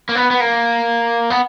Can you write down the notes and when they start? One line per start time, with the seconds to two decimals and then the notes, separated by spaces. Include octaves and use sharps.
0.09 A#3
0.15 B3
0.31 B3
0.40 A#3
1.30 B3